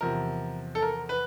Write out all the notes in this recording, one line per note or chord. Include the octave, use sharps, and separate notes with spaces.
E2 C3 F3 A#4
A4
A#4
B4